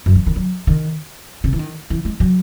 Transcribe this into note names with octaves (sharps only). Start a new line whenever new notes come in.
F#2
D#3
D#3
F#3
D#3
C#3
E3
D#3
E3
G#3
F#3